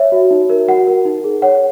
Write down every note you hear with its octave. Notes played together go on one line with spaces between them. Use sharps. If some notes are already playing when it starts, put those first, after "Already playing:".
Already playing: C#5 E5
F#4
D#4
A#4
F#4 F#5
A#4
D#4
G#4
C#5 F#5